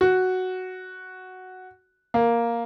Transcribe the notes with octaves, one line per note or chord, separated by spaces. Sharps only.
F#4
A#3